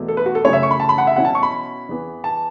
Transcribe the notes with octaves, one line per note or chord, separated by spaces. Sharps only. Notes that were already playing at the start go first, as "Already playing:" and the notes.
Already playing: E2 B2 A3 E4
A4
B4
F#4
A4
F#2 C#3 A3 C#4 E4 C#5
E5
C#6
B5
A5
B5
F#5
E5
B2 F#3 C#4 E4 F#5
A5
C#6
B5
E2 E3 B3
A5